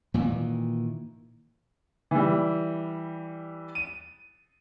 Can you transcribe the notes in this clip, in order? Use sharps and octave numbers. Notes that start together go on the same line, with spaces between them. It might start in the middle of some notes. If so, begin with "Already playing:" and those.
A#2 D#3 E3
E3 G3
D#7